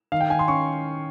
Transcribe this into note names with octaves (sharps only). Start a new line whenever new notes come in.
D#3 F5
G5
D#3 G#5
C6
C#4 C#6